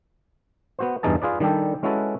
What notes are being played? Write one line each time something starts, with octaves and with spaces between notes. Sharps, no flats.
B3 F#4 C5
E2 G2 E3 D#4 G#4 A5
F4 G#4 B4 D5
D#3 G3 D4 G4 A4
G#3 C#4 E4 F#4 A4 B4